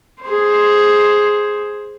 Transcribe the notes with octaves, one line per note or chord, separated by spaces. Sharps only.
G#4 C5